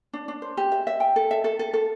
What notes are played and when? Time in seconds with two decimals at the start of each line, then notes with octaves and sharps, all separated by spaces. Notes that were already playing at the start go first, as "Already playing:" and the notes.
0.13 D4
0.28 D4
0.42 C5
0.57 G4
0.72 E5
0.87 E5
1.00 G5
1.16 A4
1.31 E5
1.44 A4
1.59 A4
1.73 A4